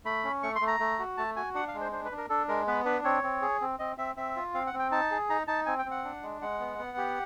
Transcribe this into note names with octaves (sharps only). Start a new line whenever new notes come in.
A3 B5
C#4
A3 C#6
C6
A3
A#5
A3
F#4
A3 A5
F#4 G#5
D4 F#5
F5
G#3
C5
D4 C5
B4
D4
A#4
D4 A4
G#3 A#4
B3 B4
D4 B4
C4 C#5
C4
G#4
C4
C4 D#5
C4 E5
C4 E5
F4
C4 F5
F#5
C4
G5
D#4 A5
G#4
D#4 A#5
D#4 A5
C4 G#5
G5
C4
F#5
D4
G#3
G#3 F#5
B3
B3
G4